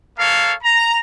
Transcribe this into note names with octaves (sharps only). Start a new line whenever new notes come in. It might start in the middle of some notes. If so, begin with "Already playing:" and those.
A#3 A4 C#5 F5
A#5